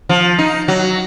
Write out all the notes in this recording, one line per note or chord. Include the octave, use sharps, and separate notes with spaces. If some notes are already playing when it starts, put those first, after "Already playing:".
F3
D#4
F#3